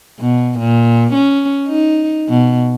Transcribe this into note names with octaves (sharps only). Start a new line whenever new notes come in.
B2
A#2
C#4
D#4
B2